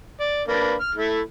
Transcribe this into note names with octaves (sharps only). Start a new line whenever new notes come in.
D5
A#3 D4 B4
F6
A3 E4